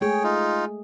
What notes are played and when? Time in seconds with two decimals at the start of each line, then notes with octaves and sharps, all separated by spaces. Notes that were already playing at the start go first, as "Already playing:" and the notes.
0.01 G#3 A3 G#4 C#5 G5
0.24 D#4 F4